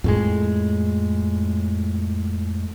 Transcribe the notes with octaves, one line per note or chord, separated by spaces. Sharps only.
F2 A2 G#3